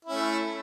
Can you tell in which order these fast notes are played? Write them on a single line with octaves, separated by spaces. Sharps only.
E4 C#4 A3